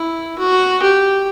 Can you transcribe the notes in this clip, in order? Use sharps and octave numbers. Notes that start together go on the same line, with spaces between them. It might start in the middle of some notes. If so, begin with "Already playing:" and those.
Already playing: E4
F#4
G4